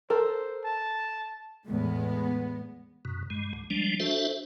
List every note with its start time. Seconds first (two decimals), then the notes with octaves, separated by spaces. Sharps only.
0.10 A4 A#4 C5
0.64 A5
1.66 E2 A2 G#3 B3
3.05 F#2 B2
3.30 G2 G#3
3.53 D2
3.70 F3 G3 G#3 D4
4.00 D4 F#4 A4 C5 E5